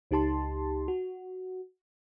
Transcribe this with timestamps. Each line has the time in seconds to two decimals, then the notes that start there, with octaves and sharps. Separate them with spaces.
0.11 C#2 D#4 G4 A5 C6
0.88 F#4